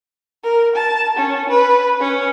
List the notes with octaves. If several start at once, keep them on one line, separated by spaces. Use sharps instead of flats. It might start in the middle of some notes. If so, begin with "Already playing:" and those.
A#4
A5
C#4
B4
C#4